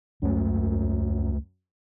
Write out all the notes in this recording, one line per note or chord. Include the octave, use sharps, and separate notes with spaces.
C#2 F#2 A3